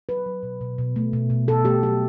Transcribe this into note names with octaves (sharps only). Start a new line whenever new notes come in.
F#3 B4
F#3
B2
B2
B2
A3
B2
B2
B2 A4
A3 G4
F#3 G4